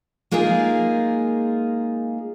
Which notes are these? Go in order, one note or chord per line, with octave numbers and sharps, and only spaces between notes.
G#3 A#3 D#4 F4 G#4